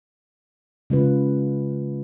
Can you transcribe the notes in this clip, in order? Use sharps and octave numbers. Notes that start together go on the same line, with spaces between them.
C#3 G#3 F4 B4